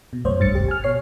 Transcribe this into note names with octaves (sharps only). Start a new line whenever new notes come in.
B2
C2 F#2 A3 C5 C#5
G#1 G2 A6 C#7
G#1 D2 C3 G4
G#5 F6
B2 C#5 C7